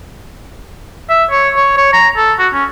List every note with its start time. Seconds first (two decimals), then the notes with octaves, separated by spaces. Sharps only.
1.09 E5
1.31 C#5
1.57 C#5
1.77 C#5
1.93 A#5
2.17 A4
2.39 F#4
2.54 C#4